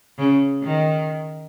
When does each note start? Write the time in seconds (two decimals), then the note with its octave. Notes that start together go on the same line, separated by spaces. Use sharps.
0.18 C#3
0.63 D#3